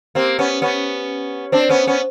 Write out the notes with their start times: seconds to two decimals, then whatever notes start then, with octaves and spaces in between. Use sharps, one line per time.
0.15 A#3 C4 G4
0.39 B3 C#4
0.62 B3 C#4
1.52 C4 D4 C5
1.69 B3 C#4
1.87 B3 C#4